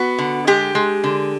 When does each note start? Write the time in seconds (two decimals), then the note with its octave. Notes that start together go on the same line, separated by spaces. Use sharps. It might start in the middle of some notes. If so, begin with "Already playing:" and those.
Already playing: B3 F#4
0.18 D3
0.47 G#3 G4
0.75 G#3
1.04 D3